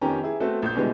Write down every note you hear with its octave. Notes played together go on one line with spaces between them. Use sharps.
F2 D#3 B3 C#4 G4 A#5
E4 G#4
A3 B3 C4 F#4 A4
A#1 G6
B2 D3 E3 G3 G#3 B3